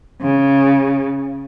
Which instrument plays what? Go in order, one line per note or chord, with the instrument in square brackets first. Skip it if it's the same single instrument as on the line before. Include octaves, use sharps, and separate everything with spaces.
[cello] C#3